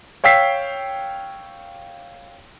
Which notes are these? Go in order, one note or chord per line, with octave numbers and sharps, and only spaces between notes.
C#5 F5 G5 E6 B6 C7